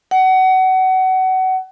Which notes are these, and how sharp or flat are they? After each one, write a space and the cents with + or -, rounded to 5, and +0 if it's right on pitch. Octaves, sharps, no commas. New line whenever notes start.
F#5 +25